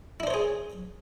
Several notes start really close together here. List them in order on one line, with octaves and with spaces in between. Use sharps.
E4 D4 C5 C#5 G#4